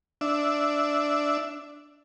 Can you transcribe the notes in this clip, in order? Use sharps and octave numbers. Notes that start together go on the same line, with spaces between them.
D4 E5